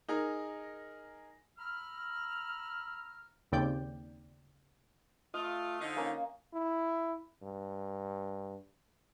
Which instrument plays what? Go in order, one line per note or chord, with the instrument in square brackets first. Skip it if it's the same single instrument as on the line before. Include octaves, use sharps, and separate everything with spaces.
[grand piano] D#4 G#4 A#4
[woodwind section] A#5 B5 E6 F6
[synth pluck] D#2 C#3 C4 D5 G5 G6
[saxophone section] A3 F4 [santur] D#5
[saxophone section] D3 F3 D#4
[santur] A#3 C#4 F5
[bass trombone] E4
G2